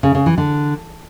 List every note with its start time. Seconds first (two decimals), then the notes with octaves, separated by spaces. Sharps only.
0.03 C#3
0.15 C#3
0.26 E3
0.38 D3